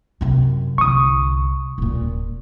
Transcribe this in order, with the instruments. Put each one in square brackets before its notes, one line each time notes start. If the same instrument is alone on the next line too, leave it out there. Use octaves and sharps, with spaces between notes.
[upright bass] F#2 C3
[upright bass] C2 D3 [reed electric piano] C#6 D#6
[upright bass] D#1 A#2